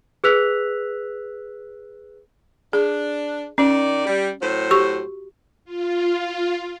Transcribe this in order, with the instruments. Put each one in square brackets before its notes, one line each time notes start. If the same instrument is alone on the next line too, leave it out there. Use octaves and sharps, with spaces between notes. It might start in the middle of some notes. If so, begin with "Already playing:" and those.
[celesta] G#4 B4 E6 F#6 B6 F7
[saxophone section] D4 [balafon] G#4
[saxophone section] D#3 D5 [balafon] C#4
[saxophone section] G3
A2 F#3 C5
[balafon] F#4 G4 C#6
[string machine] F4